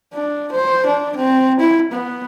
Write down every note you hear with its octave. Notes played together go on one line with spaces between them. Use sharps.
D4
C5
D4
C4
E4
B3